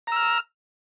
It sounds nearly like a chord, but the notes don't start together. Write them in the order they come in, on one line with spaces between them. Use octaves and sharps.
A#5 E6 F6